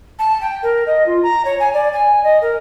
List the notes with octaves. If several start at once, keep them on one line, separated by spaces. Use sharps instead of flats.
A5
G5
A#4
D#5
F4
A#5
C#5
G#5
D5
G#5
D#5
A#4